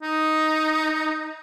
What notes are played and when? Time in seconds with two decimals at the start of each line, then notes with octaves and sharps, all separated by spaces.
0.03 D#4